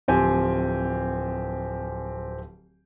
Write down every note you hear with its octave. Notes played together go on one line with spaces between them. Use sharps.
D1 F3 C4 G4 G#5